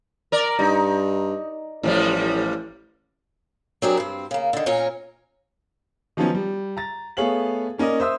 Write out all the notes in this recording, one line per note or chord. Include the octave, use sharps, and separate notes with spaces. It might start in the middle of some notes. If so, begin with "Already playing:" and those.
A#4 D5
G2 D#4
A1 A2 F3 G3
F#3 C4 D4 G4 G#4 A#4
G2 C4
C#3 A#3
D3 D#3
A#2 C#4 A#4 C#5
D#3 F3 F#3 B3 C#4
G3
A#5 A6
A3 B3 G#4 C#5 F5 F#7
A#3 C#4 A#4 D5 D#5
C5 E5 D#6 E6